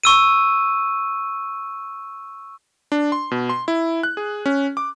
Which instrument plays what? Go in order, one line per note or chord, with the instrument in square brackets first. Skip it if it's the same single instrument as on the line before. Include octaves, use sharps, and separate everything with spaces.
[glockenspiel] C#6 E6 D#7
[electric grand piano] D4
C6
B2
C6
E4
F#6
G#4
C#4
D6